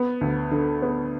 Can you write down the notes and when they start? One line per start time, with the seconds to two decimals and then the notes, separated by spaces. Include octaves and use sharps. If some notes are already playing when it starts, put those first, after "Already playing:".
Already playing: B3
0.21 D2
0.51 D3
0.82 B3